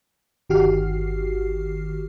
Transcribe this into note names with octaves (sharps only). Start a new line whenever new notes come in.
G1 D#3 F#4 G4 F6 C7